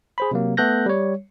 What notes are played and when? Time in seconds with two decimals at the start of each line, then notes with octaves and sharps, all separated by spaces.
0.18 G#4 C5 B5
0.31 C3 F#3 A#3
0.57 A3 B3 A4 F#6 G6 A#6
0.86 G3 C#5